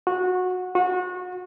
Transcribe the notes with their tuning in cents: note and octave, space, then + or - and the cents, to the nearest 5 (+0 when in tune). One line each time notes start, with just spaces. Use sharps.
F#4 -20
F#4 -30